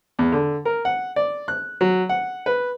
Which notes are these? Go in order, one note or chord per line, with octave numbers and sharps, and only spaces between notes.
E2
D3
A#4
F#5
D5
F#6
F#3
F#5
B4